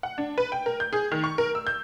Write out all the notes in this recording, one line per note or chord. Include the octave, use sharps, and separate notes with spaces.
F#5
D4
B4
G5
A#4
G6
G#4
D#3
C#6
A#4
E6
G6